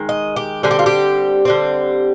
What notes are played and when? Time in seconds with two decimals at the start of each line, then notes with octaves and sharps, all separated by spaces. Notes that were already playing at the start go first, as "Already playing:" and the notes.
Already playing: D#3 G#3
0.09 D#5
0.36 G4
0.63 D3 G3 C4 G#4
0.71 G4
0.79 F4
0.86 G4
1.45 D3 G3 C4